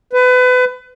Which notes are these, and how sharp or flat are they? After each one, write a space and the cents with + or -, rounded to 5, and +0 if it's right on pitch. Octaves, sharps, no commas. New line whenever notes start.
B4 +30